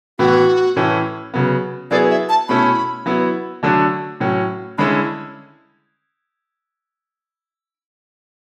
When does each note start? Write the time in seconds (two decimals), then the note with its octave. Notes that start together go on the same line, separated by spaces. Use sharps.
0.19 A2 E3 B3 E4 F#4
0.76 A2 E3 A3 C#4 E4
1.34 C#3 F#3 B3
1.91 F#3 B3 E4 G#4 B4 D5
2.10 E5
2.29 A5
2.48 B2 A3 C#4 E4 B5
3.06 F#3 B3 E4
3.63 D3 F#3 A3 D4
4.20 A2 F#3 C#4
4.78 D3 G#3 C#4 E4 B5